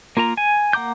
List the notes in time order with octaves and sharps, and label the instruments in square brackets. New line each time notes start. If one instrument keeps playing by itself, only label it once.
[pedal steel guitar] A#3 F4 A#4 A#5
G#5
A#3 F#5 A#5 D6 G6